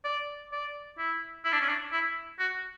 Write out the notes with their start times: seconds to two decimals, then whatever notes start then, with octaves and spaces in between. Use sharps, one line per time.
0.04 D5
0.52 D5
0.98 E4
1.45 E4
1.52 D4
1.61 C#4
1.69 D4
1.92 E4
2.39 F#4